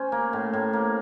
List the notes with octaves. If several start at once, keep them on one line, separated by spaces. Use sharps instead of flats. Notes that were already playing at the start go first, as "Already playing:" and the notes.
Already playing: C#4 C5
A#3
A2
A2
A#3